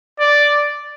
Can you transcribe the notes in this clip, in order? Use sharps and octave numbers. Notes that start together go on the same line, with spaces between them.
D5